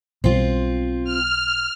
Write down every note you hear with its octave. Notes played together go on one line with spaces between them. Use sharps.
B1 B2 G3 C4 F4
F6